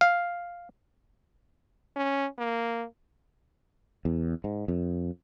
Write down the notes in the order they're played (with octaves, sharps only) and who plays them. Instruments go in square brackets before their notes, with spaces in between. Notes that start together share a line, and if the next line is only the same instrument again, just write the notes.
[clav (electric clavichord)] F5
[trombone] C#4
A#3
[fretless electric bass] E2
G#2
F2